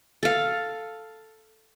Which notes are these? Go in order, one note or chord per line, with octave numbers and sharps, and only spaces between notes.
A4 F5